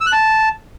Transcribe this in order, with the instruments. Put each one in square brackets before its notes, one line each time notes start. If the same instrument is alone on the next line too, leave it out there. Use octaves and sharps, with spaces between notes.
[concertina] E6
F#6
A5